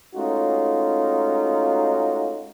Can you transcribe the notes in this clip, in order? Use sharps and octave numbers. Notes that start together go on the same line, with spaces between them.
G#3 A3 C#4 D#4 F4 F#4